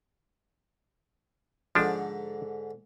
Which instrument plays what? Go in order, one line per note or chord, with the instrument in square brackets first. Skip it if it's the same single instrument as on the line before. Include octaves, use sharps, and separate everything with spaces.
[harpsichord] G#2 D3 G#3 [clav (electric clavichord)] F3 D4